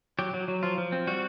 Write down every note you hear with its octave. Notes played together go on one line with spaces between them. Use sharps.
F#3 G4
F#3
F#3
F3 F4
F3
C4
G3 F#4